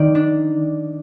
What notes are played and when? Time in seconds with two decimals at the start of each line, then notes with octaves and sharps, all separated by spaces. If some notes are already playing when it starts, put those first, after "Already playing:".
Already playing: D#3 D5
0.15 D4